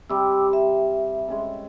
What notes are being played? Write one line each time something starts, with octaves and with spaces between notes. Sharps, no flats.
C3 G3 G5 D6 E6
E5
G#3 C#4 A4